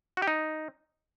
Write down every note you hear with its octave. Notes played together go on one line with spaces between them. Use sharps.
F#4
G4
D#4